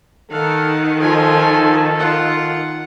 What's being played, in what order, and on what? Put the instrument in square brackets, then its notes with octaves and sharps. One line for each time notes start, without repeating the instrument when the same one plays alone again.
[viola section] D#3 [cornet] A4 [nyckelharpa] F5 [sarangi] F#5
[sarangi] F3 [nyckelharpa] F4 G#5 [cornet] A4
[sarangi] F4 [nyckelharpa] F#5